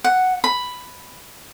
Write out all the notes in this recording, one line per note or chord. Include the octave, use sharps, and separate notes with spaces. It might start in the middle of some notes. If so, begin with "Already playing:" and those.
F#5
B5